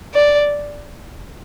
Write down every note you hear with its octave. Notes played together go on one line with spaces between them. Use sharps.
D5